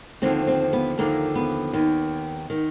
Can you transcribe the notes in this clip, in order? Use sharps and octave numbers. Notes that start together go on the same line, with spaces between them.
D#2 D3 F3 C4
C4
B3
D#2 D3 F3 A#3
B3
D#2 D#3
D#3